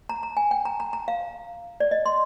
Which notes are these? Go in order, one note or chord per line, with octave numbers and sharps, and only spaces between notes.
A#5
A#5
G#5
G5
A#5
A#5
A#5
F5
D5
D#5
C6